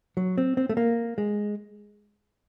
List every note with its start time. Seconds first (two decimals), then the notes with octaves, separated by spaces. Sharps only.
0.17 F#3
0.38 C4
0.57 C4
0.69 A3
0.77 A#3
1.18 G#3